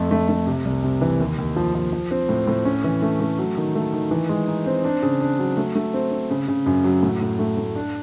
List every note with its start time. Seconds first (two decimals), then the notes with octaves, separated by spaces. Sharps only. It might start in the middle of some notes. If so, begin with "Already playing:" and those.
Already playing: F2 A3
0.11 A3
0.29 A3
0.47 C3
0.65 C2
0.84 C3
1.01 E3
1.20 D#2
1.38 D#2
1.56 F3
1.75 F3
1.93 F3
2.11 C4
2.29 A2
2.47 A2
2.65 C#4
2.84 E3
3.02 A3
3.20 A3
3.39 F#3
3.57 D#3
3.75 A3
3.93 D#3
4.11 E3
4.29 G#3
4.48 D#4
4.66 C4
4.85 D4
5.03 C#3
5.21 D4
5.39 F#3
5.57 A3
5.75 A3
5.94 C4
6.12 C4
6.30 C#3
6.48 C#3
6.66 F#2
6.84 F#3
7.03 A2
7.21 A2
7.39 A3
7.57 A2
7.76 D4